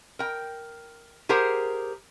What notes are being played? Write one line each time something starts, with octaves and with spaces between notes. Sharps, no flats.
A#4 G5
G4 G#4 A#4 C5 F#5